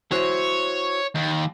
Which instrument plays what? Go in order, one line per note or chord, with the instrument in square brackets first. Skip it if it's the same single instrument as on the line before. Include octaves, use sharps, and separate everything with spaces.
[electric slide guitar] E4 F#4 C5 [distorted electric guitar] C#5
[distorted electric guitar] D#2